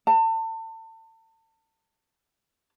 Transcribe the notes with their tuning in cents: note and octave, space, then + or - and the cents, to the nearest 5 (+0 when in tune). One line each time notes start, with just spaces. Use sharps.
A5 +35